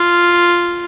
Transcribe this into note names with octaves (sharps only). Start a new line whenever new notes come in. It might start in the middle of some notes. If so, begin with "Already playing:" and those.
Already playing: F4